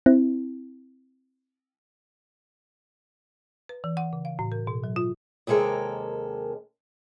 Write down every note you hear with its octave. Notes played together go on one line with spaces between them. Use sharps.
C4 E4
B4
E3
F#5
C#3
F5
A2
A#4
B2
F#3
F4
D#2 C3 G#3 A4 A#4